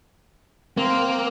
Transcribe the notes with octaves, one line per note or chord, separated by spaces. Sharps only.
A#3 C4